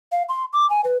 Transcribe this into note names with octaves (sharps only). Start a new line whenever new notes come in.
F5
C6
D6
G#5
B4